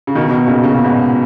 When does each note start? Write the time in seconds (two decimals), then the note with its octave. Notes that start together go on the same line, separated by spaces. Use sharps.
0.07 C#3
0.15 B2 D#3
0.31 B2 D#3
0.48 A#2 C#3
0.64 C#3
0.70 B2
0.77 A#2
0.84 G#2 B2